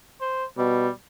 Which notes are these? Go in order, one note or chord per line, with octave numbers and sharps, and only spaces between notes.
C5
B2 G3